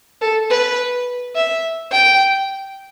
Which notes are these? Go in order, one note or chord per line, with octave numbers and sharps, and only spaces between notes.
A4
B4
E5
G5